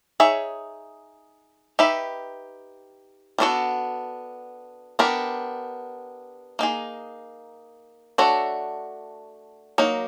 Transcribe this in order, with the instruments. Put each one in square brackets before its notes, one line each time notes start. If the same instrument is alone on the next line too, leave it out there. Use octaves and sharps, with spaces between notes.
[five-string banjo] D#4 G#4 C#5 E5
D#4 G4 B4 E5
G3 B3 D4 F#4 A4
B3 D4 G4 A#4
A#3 D#4 G#4
A3 D4 F#4 A4 C#5
F#3 A#3 D#4